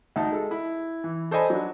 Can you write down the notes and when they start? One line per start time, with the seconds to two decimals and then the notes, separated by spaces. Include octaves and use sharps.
0.16 D2 D#4 A5
0.32 G#3 A4
0.51 E4
1.04 E3
1.31 A4 C5 D5 D#5 G#5 B5
1.50 F#3 D4